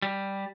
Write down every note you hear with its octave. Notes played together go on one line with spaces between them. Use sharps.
G3